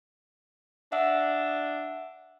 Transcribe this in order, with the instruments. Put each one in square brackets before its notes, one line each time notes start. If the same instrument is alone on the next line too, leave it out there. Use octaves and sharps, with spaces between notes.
[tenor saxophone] D4 [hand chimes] E5 F#5 E6